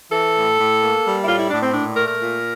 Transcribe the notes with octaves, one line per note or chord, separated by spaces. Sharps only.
E3 A4
A2
A2
A#3
G3
E4
A2 F4
E4
A2 D4
C4
A#2 D4
A3 A#4
A#4
A#2